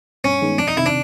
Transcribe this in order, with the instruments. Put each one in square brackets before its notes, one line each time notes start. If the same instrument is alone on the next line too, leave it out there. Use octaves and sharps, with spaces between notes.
[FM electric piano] G2 [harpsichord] C#4
[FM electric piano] D#3 G#3 B3 D#4
[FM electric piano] F2 [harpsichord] D4
[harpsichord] D#4
[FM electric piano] C3 D#3 [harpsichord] E4
[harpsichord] D4